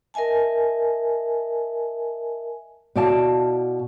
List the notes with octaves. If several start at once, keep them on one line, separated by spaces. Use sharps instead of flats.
A#4 D#5 E5 G#5 A5
B2 E4 D5 F5 A5